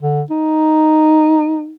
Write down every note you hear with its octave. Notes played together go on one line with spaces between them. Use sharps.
D3
D#4